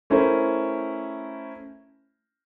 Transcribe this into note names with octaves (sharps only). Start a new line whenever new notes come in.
A3 C#4 E4 A#4 C5